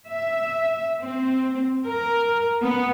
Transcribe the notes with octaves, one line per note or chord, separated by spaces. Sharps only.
E5
C4
A#4
B3